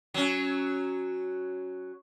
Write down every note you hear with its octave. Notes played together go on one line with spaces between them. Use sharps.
F#3 C#4